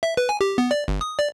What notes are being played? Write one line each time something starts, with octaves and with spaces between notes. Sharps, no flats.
E5
B4
G#5
G4
B3
D5
G1
D#6
D5